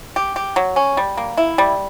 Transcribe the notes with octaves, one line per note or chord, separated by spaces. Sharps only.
G4
G4
F#3
C#4
G3
A#3
E4
G3